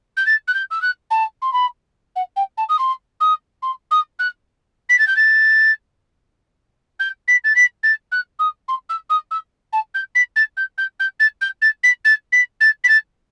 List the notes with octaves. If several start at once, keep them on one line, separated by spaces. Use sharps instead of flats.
G6
A6
F#6
G6
E6
F#6
A5
C6
B5
F#5
G5
A5
D#6
C6
D#6
C6
D#6
F#6
B6
A6
G6
A6
G6
B6
A6
B6
A6
F#6
D#6
C6
E6
D#6
E6
A5
G6
B6
A6
G6
G6
G6
A6
G6
A6
B6
A6
B6
A6
B6
A6